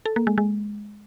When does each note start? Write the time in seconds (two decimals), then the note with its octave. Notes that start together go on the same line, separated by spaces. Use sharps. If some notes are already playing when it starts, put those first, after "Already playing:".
0.06 A4
0.16 A#3
0.27 G#3
0.38 G#3